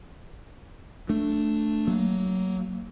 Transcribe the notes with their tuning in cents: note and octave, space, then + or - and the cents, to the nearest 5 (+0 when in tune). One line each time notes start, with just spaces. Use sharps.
A3 +0 D4 +0
F#3 +15 A#3 -15